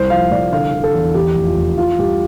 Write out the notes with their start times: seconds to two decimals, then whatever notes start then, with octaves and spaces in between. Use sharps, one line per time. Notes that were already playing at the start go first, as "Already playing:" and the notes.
Already playing: C2 C5
0.10 F3 F5
0.31 C2 D5
0.53 D3 F5
0.73 D3
0.84 A4
0.94 E2
1.14 E2 G4
1.35 F1
1.46 F4
1.57 F1
1.78 E3 F4
1.99 G2 G4